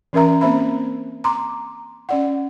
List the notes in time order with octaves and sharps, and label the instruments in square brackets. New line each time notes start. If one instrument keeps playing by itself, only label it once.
[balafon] E3 C#4 A#4 E5 A#5
A#3 C4 C5 E5 B5
A#5 C6 D6
C#4 D5 F#5